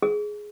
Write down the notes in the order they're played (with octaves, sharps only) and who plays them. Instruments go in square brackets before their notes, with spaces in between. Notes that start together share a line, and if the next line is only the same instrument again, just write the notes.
[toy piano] G#4